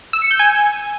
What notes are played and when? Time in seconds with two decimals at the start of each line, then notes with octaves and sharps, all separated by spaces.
0.13 E6
0.22 C#7
0.31 G6
0.39 G#5